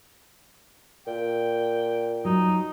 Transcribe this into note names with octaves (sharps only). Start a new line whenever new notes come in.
A#2 G5
F#3 D#4